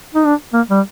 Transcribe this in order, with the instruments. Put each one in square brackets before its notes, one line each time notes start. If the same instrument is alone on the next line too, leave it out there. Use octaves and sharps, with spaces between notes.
[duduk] D#4
D4
A#3
G3